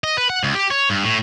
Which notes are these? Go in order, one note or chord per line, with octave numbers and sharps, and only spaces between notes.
D#5
B4
F#5
C#2
G4
C#5
G2
A2